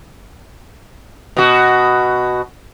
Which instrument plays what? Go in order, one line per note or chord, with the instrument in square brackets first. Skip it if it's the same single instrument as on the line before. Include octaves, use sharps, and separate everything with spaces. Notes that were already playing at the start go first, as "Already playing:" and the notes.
[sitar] B2 F#4